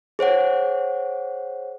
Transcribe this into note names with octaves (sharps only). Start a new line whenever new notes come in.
G#4 C5 C#5 F#5